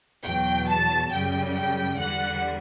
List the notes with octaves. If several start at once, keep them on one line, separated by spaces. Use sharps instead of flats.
E2 B2 F#3 G5
A5
F#2 C#3 G3 G5
G5
E2 D3 G3 F#5